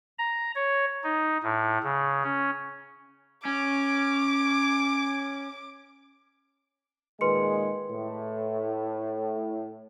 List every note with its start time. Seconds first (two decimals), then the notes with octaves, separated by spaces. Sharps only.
0.18 A#5
0.55 C#5
1.04 D#4
1.43 A2
1.83 C#3
2.24 C#4
3.45 C#4 D6
7.21 A#2 D#3 G#3 B4 C6 C#7
7.90 A2